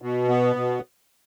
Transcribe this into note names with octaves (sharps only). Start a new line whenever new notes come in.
B2
B3
B2